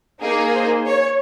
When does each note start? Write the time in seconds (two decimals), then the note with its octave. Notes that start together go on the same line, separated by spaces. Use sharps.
0.22 A#3 D#4 G#4 A#4
0.54 C5
0.86 C#5